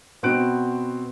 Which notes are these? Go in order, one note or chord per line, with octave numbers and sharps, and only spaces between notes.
B2 B3 C4 F#4 F#6 D7